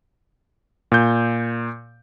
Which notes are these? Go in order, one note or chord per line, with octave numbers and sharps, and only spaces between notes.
A#2 G6